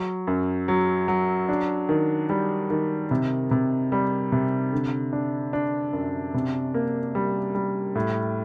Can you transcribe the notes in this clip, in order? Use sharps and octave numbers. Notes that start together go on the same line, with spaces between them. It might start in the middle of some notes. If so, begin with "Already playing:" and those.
Already playing: F#3
F#2
F#3
F#3
D4
D#3
G3
D#3
C3
C3
G3
C3
D3
D4
D4
F#2
C3
A#3
G3
G3
A2